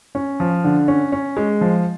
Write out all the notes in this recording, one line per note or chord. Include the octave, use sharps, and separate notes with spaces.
C#4
F3
D3
C#4
C#4
G#3
F3